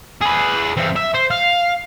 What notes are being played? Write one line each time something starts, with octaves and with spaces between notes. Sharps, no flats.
G#4 B4
E3 C4
E5
C5
F5